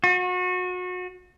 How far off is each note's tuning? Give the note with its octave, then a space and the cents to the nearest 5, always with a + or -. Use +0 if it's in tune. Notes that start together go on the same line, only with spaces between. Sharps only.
F#4 -30